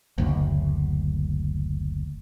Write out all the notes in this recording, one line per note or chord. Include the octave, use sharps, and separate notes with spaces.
F#1 D2